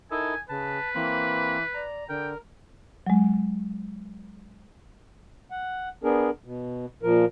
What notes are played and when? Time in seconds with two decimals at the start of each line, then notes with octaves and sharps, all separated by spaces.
0.11 D#4 E4 A4 A#4 G#5
0.49 C#3 B4 A5
0.95 E3 A#3 C4 B5
1.74 D5 A#5
2.09 D3 A#4 G5
3.06 F#3 G#3
5.51 F#5
6.04 B3 D4 G#4 A#4
6.44 B2
7.03 A#2 F3 A#4